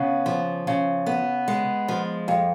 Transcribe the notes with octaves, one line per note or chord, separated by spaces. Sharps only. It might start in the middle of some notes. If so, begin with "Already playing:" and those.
Already playing: C#3 B3
F3
C#3
B3
G#3
F3
F2